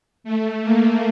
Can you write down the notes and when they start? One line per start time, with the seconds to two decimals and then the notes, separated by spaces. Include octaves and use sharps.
0.24 A3
0.63 A#3